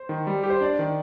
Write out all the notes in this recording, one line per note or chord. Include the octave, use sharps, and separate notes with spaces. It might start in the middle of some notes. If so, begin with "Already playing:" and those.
Already playing: C5
D#3
G3
G4
C5
D4 D5
D#3